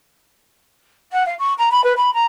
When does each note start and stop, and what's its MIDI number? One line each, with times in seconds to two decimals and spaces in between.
1.12 1.25 78
1.25 1.34 77
1.38 1.53 85
1.58 1.69 82
1.71 1.83 83
1.84 1.93 71
1.96 2.13 83
2.13 2.26 82